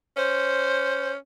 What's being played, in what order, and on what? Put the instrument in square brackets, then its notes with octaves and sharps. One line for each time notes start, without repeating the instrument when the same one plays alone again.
[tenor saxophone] C#4 [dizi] C5